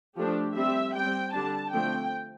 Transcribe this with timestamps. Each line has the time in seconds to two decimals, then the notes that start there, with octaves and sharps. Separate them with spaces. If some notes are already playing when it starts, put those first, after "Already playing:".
0.16 F3 A3 D4 G4
0.55 G3 C4 E5
0.94 G3 C4 G5
1.33 D3 G3 D4 A5
1.72 D3 F3 A3 C4 G5